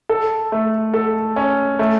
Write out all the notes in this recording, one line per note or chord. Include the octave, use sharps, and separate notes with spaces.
A4
A3
A4
C#4
A3